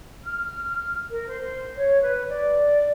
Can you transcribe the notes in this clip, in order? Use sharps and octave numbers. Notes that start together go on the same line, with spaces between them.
F6
A#4
C5
C#5
B4
D5